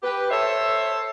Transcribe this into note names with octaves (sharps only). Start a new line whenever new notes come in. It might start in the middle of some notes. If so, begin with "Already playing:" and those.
G4 B4
A4 C5 C#5 E5